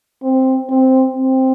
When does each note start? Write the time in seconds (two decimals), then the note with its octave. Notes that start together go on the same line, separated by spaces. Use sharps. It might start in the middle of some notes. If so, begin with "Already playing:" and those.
0.23 C4
0.70 C4
1.16 C4